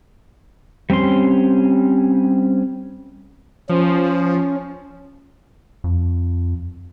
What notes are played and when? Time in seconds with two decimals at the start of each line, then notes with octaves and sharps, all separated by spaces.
0.90 G3 C4 C#4 C6
3.69 F3 C#4
5.84 F2